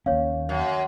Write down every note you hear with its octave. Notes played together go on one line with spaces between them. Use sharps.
D#2 A#3 C#4 C#5 F5
F#2